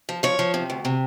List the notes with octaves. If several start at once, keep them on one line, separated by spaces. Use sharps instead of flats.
F3
F3 C#5
F3
C3
D2
C3